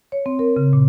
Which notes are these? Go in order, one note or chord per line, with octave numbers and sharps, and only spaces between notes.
C#5
C4
A#4
C#3
A#2